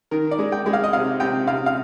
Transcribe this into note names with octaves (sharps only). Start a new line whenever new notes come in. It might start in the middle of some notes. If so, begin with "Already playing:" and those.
D#3 A#4
D5
G#3
G5
G#3
F5
D#5
C3 F5
C3 G5
C3 F5
F5